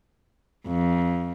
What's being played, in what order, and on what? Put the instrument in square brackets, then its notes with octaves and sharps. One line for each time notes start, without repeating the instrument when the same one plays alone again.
[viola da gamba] F2